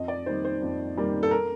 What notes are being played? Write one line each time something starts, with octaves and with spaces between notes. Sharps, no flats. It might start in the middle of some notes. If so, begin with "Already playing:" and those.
Already playing: F2 D#5
D5
D#3 G3 A#3 C5
C5
F2
D#3 G3 A#3
A4
A#4